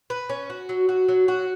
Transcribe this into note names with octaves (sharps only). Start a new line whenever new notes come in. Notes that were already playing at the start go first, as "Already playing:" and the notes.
B4
C#4
F#4
F#3
F#4
F#3
F#4